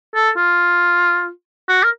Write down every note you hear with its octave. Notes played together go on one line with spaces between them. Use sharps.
A4
F4
F#4
A#4